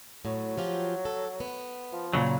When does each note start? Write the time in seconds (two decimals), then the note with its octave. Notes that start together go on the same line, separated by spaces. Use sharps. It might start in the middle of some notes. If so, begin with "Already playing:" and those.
0.25 A2 F#3
0.58 F3 F4 G4
1.05 A4
1.40 B3
1.92 F3
2.13 A#2 C#3 F#3